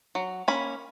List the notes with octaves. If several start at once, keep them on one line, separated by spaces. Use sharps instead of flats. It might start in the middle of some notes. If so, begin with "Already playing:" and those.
F#3
A#3 C#4 B5